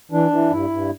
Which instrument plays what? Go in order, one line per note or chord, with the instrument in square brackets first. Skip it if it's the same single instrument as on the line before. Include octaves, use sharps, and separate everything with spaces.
[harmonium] E3 D4
E3
G2 E4
G2